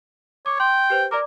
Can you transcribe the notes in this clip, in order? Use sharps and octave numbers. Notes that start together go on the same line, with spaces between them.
C#5 D6 G#6
G5 C6
G4 B4 C5
A#4 D5 A#5 D6